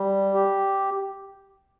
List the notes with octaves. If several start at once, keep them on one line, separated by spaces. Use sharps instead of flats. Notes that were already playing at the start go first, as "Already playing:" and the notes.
Already playing: G3
G4